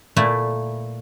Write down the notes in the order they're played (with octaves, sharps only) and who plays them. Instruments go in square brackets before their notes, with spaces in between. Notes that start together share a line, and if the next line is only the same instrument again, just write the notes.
[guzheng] A#2 A3 E4